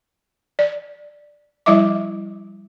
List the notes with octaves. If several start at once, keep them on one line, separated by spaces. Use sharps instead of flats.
D5
F3 G3 E4 D#5 E5 D6